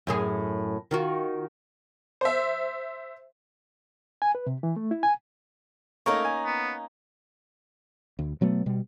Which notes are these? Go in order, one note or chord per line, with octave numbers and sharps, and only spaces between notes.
F#2 A2 G#4
D#3 F4 F#4
C5 E5
G#5
B4
C3
E3
A3
E4
G#5
A3 A#3 C#4 D#4 A#4 C#6
G#5
B3
D2
B2 F#3 A3 B3
B2 G3